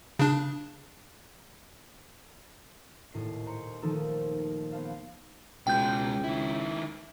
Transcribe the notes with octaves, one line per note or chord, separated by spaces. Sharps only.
C#3 D4
D#1 A2 D#5 C7
C5 A#5 C6 C#7
D#3 F3 A3 D#4 A4
B3 C5 F5 A5
C#2 B2 G#3 G5 G6
D#3 E4